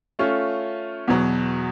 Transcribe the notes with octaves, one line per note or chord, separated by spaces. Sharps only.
A3 C#4 F4
E2 B2 F#3